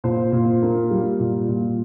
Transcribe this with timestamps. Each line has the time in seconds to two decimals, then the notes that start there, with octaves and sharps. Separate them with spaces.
0.04 A#2 C5
0.32 A#2
0.62 A#3
0.91 G3
1.20 A#2
1.48 A#2